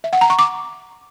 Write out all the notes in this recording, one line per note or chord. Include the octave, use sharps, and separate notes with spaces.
E5
F#5
A#5
C#6
D6